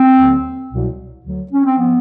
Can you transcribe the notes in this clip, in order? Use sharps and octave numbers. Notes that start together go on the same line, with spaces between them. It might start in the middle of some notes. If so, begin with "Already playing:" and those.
Already playing: C4
D#2 D3 F#3
C2 B2 F#3
D2 D3 F#3
C#4
C4
F3 B3